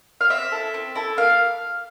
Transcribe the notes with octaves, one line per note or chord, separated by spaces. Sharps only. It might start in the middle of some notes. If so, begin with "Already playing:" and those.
F5
C4 E5
E4 A4
C4
E4 A4
A#3 F5